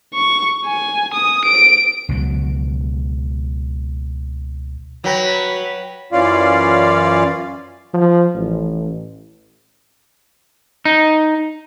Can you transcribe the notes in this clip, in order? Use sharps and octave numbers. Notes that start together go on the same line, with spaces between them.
C#6
G#5
D#6
D7
C#2 B2 F#3
F#3 B4 C#5 G5 A#6
F#2 E3 C#4 F4 D5 F5
F3
A1
D#4